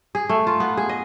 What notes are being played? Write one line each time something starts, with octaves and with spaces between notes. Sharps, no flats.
G#4
A3
F4
B3
G#4
D#5